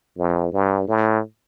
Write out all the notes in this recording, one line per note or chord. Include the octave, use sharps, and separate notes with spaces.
F2
G2
A2